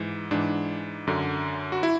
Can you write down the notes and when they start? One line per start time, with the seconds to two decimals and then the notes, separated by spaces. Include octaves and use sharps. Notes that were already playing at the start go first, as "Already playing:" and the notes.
Already playing: G#2 E3
0.31 G#2 E3 D4
1.07 F#2 D3
1.72 F#4
1.83 E4